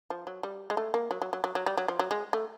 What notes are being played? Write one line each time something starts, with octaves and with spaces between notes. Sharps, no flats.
F3
F#3
G3
G#3
A3
A#3
F#3
F#3
F#3
F#3
F#3
G3
F#3
F3
F#3
G#3
A3